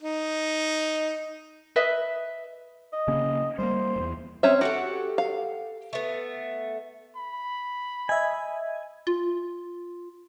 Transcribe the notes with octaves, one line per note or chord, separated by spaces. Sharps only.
D#4
B4 D#5 E5
D#5
C#3 A#3 C#4
G3 G#3 A#3 C5
D1 E2
C4 C#4 E5
F#4 G4 A4 F#5
F5
A3 B3
B5
D#5 E5 G#5
F4